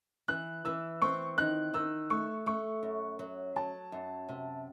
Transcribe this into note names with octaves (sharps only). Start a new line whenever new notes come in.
E3 F#6
E3 E6
C4 C#6
D#3 F#6
D#3 E6
A3 C#6
A3 C#6
F#2
F#3
F#3 A5
F#2
C3